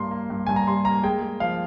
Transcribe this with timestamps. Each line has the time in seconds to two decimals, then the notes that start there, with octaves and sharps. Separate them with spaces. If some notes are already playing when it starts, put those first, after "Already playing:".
Already playing: G2 G3 A#3 C6
0.11 A#3
0.30 G2
0.47 G2 G#5
0.56 A#5
0.67 G3 C6
0.85 A#3 A#5
1.03 G#3 G5
1.22 G#3
1.40 F3 F5